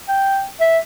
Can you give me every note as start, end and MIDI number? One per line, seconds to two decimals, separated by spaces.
0.08 0.44 79
0.61 0.79 76